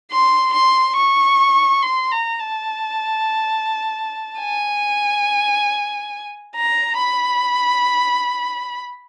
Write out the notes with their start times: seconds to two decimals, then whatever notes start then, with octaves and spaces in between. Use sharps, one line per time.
0.11 C6
0.54 C6
0.96 C#6
1.82 C6
2.12 A#5
2.40 A5
4.40 G#5
6.56 A#5
6.98 B5